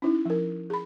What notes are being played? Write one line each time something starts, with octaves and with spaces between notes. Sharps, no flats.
C#4 D#4 E4
F3 A#4
G#4 B5